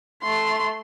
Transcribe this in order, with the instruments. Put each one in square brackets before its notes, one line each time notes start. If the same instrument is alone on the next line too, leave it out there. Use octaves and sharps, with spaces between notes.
[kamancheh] A3 C6